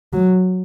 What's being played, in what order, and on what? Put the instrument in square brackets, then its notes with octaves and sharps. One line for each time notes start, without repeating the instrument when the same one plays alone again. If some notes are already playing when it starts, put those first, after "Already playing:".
[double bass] F#3